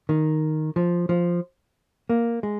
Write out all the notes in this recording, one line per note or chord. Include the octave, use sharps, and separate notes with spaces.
D#3
F3
F3
A#3
G#3